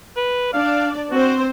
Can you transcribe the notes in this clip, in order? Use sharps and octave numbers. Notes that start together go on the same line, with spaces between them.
B4
D4 D5 F5
C4 F#4 C5